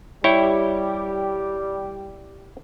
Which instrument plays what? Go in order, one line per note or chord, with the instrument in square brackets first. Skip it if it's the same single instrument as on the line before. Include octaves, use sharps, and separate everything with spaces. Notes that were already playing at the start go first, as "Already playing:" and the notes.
[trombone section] G3 G4 [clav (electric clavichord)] E4 C#5 G5